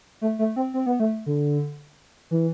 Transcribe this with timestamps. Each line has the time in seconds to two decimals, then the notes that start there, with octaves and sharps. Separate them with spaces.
0.21 A3
0.39 A3
0.56 C4
0.74 C4
0.86 B3
1.00 A3
1.26 D3
2.31 E3